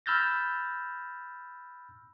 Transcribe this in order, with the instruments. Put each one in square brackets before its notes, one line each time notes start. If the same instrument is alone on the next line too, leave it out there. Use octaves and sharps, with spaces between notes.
[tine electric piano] B5 E6 F6 G6 A6 A#6